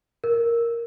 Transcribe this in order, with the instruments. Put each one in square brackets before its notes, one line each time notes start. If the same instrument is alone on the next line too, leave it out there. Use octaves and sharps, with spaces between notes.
[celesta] A#4